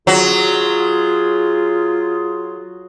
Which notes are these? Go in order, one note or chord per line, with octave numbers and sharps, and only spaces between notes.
F#3 F4 G#4